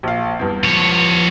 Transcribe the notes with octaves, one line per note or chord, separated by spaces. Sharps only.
A#1 F5
E2 G2
F3 C#5